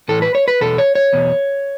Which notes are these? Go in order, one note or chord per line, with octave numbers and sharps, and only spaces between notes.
A2 E3 A4
B4
C#5
B4
E2 B2 A4
C#5
C#5
E2 B2